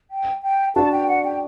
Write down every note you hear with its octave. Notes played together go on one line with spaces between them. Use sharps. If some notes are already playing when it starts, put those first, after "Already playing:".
G5
G5
D4 F#4 A5
G5
F#5
G5